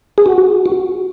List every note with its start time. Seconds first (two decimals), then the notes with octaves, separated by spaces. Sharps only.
0.18 G#4
0.26 F#4
0.66 F#4